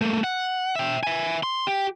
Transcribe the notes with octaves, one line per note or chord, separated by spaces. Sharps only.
A3 A#3
F#5
E5 G5
E5 G#5
C6
G4